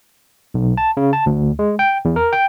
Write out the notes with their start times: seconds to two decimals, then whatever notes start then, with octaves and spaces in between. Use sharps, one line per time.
0.54 B1
0.78 A5
0.97 C#3
1.13 A5
1.26 D2
1.59 G#3
1.79 G5
2.05 E2
2.16 A#4
2.33 G5